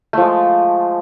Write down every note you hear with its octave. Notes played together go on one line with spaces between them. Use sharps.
F3 G#3 A3